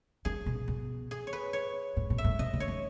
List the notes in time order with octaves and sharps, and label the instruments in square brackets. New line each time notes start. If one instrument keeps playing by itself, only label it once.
[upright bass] D#3 [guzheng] G#4
[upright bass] B2
B2
[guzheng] G#4
C#5
B4
C#5
[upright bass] A2
B2
[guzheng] E5
[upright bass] A2
[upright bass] B2 [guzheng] D#5
[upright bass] C#3
[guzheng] C#5
[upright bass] D#3